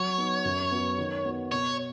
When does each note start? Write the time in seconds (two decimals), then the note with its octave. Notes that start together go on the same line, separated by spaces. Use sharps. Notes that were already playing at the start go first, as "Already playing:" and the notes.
Already playing: F#3 C#5
0.18 B3 D#4
0.45 F#2
0.71 F#3 B3
0.98 D#3
1.25 B3 F#4
1.52 B2 C#5